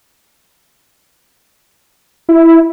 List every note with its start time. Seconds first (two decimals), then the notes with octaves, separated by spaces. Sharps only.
2.29 E4